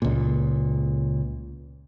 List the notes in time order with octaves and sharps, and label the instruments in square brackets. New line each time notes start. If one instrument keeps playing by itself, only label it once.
[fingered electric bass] C#2 A#2